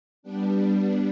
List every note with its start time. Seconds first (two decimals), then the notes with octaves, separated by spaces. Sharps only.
0.23 G3 B3 D4